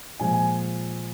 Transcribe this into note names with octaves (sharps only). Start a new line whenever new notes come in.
A#2 F3 G#3 G#5
G#5